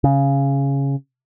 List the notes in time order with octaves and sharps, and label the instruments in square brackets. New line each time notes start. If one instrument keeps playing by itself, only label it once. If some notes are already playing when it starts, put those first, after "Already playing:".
[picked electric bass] C#3